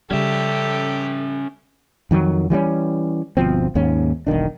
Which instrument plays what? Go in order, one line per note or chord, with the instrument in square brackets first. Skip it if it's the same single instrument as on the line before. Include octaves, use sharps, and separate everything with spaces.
[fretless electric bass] C#3 G3 [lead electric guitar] C#4 E5 [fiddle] G4 [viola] A4
[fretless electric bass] F2 D#3 E3 F#3
E3 G3 A#3 C#4
G1 B2 F3 C4
D#2 G#2 C#4
E1 B1 D#3 D4